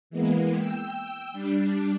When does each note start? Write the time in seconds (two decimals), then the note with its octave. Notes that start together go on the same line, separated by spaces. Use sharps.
0.10 E3 G#3 A#3 B3
0.57 G5 E6
1.32 G3 D4